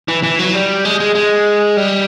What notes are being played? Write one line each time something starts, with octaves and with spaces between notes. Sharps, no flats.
E3
E3
F#3
G3
G#3
G#3
G#3
G3